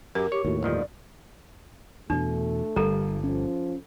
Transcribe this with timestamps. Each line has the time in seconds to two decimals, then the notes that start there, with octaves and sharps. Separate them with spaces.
0.15 F#2 G4 A#4
0.32 G4 C#5
0.45 D#2 A2 F#4
0.63 G1 D#3 F3 D5
2.10 E2 B2 A3 D4
2.76 G1 D3 G3 A4 A#4 A#5
3.24 F3 C#4